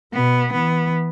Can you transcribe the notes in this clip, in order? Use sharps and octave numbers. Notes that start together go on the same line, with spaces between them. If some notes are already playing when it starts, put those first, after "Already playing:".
B2 B3
E3 B3